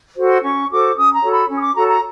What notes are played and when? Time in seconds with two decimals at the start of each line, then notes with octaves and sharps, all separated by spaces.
0.17 F#4 A4 C5
0.26 C6
0.43 C#4 C#6
0.70 F#4 A4 C5 D6
0.96 C#4 D#6
1.14 A#5
1.22 F#4 A4 C#5
1.32 B5
1.48 C#4
1.57 D#6
1.63 D6
1.75 F#4 A4 C#5 A#5
1.89 A#5